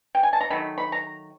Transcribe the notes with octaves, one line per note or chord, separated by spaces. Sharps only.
G5
G#5
A5
A#5
D#3 F#3 A3 B5
B5
A#5